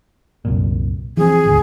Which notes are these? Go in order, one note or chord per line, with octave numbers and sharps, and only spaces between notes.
C2 F#2 A#2
E3 F3 C4 G#4
G#1 D2